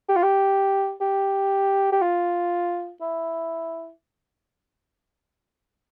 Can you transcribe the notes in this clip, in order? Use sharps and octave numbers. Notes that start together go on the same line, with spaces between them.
G4
F4
G4
G4
G4
F4
E4